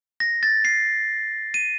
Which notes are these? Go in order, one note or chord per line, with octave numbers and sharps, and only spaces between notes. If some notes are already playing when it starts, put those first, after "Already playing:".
A#6
A6
C7
D#7